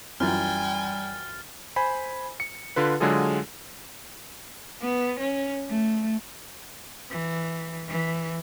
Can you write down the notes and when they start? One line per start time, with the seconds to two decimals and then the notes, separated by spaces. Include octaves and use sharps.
0.20 F#2 E3 G3 F4 G5 G#5 F6 A6
1.76 C5 G#5 B5
2.40 C#7
2.76 D3 F4 B4
3.00 D3 F#3 G#3 F4 G#4 A4
4.81 B3
5.19 C#4
5.69 A3
7.11 E3
7.88 E3